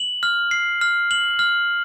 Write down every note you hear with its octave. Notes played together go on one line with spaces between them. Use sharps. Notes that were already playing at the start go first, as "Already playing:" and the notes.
Already playing: F#7
F6
C7
F6
F#7
F6